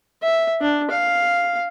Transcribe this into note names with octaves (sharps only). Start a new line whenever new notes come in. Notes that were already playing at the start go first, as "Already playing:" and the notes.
E5
D4
F5